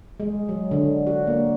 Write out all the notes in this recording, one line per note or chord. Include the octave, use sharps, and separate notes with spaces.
G#3
F#3
D3
F#4
A#3